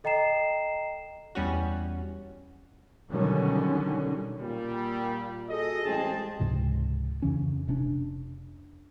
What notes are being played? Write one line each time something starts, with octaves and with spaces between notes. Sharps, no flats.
A4 D#5 G5 A#5 C7 E7
E2 G3 C#4 F#4
B2 D3 D#3 F#3 G3 C#4
A#2 G3
F#4 G#4 A4 D#5
A1 G3 G#3 C4 G#4 A5
C#2 G#2 C3 F3
F2 C#3 E3 C#4
F1 C3 C#4 D4